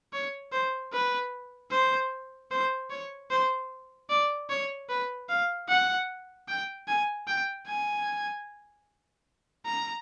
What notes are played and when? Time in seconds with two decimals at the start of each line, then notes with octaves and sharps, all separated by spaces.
0.13 C#5
0.52 C5
0.92 B4
1.71 C5
2.51 C5
2.90 C#5
3.30 C5
4.10 D5
4.50 C#5
4.89 B4
5.29 F5
5.69 F#5
6.48 G5
6.88 G#5
7.27 G5
7.68 G#5
9.66 A#5